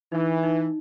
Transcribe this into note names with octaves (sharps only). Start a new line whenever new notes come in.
E3 D#4
D#4